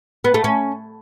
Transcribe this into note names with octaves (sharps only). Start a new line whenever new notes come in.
B3
A3
C#4